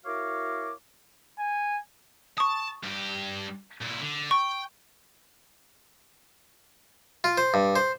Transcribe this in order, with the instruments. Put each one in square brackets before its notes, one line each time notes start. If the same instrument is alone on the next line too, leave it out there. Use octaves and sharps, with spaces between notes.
[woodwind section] E4 F#4 A#4 C#5 F5 D6
[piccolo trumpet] G#5
[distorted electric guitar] A5 [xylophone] C#6 D#6
[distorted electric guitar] G2 G4
A#2 E4
D3
[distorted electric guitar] G5 [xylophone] C#6
[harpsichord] F4
C5
G2
C5